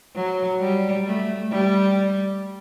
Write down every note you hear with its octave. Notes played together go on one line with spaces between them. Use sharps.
F#3
G3
A3
G3